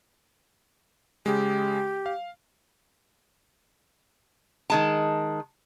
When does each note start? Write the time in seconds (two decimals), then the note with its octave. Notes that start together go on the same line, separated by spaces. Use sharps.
1.26 C#3 G#3 G4
2.06 F5
4.70 D#3 G#3 A5